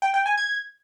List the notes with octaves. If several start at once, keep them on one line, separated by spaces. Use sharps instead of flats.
G5
G5
G#5
G#6